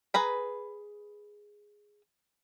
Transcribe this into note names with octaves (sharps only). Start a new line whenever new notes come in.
G#4 B4 A#5 B5